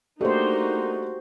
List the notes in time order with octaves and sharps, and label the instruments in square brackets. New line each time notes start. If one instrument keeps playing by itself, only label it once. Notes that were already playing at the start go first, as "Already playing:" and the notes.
[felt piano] A3 D4 [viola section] A#3 D#4 [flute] F#4 [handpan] G4 C5